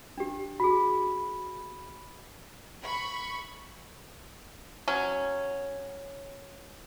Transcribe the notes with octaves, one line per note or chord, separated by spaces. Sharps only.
D4 G4
F#4 G#4 B5
B5 C#6
F#3 C#4